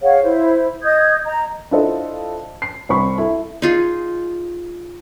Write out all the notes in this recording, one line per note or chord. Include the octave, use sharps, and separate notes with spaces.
G#4 C#5 F5 F#5
E4 C5
D#5 D#6 G6 G#6
D#5 A#5
D4 E4 F4 A4 C5 D#5
C7
C2 C4 B5 C#6
E4 A4
D#4 F4 G#4